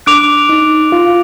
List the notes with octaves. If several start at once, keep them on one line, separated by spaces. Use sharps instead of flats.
D4 D6 F#6 D7 F7
D#4
F4